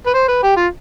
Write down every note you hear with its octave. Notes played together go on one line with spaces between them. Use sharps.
B4
C5
B4
G4
F4